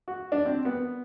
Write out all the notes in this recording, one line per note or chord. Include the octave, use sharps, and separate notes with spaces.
F#4
D4
C4
B3